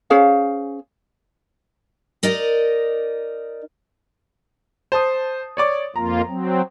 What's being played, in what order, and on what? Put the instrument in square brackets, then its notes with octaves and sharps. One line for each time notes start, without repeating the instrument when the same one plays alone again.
[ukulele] C#4 G#4 C5 F5
[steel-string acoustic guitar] D#4 A#4 D5 D#5
[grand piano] C5 A5 D#6
C#5 D5 D6
[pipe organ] F2 A#3 F4 [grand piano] A#5
[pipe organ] F#3 C4